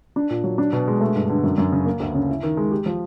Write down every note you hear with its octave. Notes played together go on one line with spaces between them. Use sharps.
D4
A#2
F#3
D4
B2
G#3
A3
G2
D3
F#2
F#2
C#3
A#3
D2
C#3
E4
D#3
G#3
G4
F3